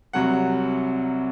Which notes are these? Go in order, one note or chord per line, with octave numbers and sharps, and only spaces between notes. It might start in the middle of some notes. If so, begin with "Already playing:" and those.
C2 C3 F#3 F#5